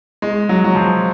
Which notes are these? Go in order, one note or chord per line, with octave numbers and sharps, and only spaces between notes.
G#3
F#3
F#3
F3